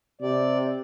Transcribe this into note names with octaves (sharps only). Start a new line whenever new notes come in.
C3 D5